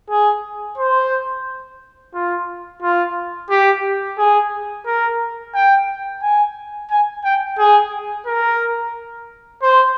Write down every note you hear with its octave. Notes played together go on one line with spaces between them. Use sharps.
G#4
C5
F4
F4
G4
G#4
A#4
G5
G#5
G#5
G5
G#4
A#4
C5